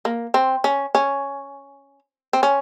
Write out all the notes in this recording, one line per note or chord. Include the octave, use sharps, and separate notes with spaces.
A#3
C4
C#4
C#4
C4
C#4